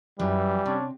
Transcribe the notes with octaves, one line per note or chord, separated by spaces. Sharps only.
F#2 E3 F#3 G3
C3 C#4 D4